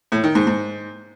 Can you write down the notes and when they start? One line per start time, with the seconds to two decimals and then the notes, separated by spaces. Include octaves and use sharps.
0.12 A2
0.24 D#3
0.35 G#2
0.47 G#2